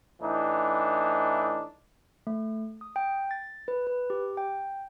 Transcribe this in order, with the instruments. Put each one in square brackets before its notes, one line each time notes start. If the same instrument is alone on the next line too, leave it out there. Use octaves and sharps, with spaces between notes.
[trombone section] A2 E3 D4 D#4
[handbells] A3
D#6
G5
A6
B4
B4
G4
G5